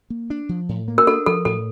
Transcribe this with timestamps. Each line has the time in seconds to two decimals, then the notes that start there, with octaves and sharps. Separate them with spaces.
0.10 A#3
0.30 D4
0.49 F3
0.69 A2
0.88 A#3
0.98 A#4
1.07 D4 A4
1.26 F3 A4
1.45 A2 A4